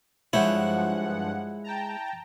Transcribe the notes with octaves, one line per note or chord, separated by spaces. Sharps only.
G2 F3 G#3 E4 C5 C#5 F#5
G5 A5 A#5